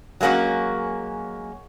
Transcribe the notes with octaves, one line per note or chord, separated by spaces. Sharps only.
F#3 G#3 A#3 C#4 F#4